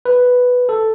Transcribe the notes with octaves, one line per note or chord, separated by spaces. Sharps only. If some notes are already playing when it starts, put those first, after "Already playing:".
B4
A4